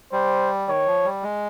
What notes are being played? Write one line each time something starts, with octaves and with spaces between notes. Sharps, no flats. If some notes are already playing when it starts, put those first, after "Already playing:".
G3 C5
D#3 C#5
F3
G3
G#3